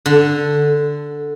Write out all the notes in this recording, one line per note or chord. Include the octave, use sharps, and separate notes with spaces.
D3